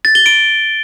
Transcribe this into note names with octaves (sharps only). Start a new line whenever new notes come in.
A6
G7
D7